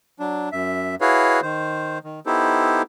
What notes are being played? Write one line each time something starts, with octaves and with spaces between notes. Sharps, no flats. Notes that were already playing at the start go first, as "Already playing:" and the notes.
F#3 D4
F#2 E5
E4 F#4 G#4 B4 C#5 F5
D#3 C5
D#3
B3 D#4 E4 G4 A4 C5